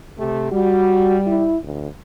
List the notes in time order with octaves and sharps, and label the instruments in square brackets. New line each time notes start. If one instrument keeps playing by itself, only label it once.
[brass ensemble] C3 A3 G4
[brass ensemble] G3 [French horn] F#4
[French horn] E4
D2